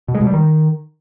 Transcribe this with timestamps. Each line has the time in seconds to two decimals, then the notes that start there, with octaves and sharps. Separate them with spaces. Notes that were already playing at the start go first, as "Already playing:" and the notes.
0.08 B2
0.15 G#3
0.21 B2
0.27 G3
0.33 D#3